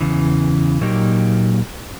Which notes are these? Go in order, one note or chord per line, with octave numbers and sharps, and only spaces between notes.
E2 C#3 E3
A#2 F#3 A#3 D#4 G4